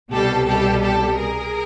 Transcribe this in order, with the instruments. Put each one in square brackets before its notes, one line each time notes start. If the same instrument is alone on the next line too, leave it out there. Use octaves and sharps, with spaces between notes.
[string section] C2 B2 G3 G4 A4
G4 A4
G4 A4
G#4 A#4